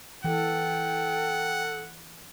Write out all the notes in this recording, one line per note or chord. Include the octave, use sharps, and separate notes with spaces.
E3 A4 F#5 G5